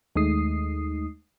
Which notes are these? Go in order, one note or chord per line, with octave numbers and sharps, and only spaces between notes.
D#2 G#3 A3 D#4 D#6 C7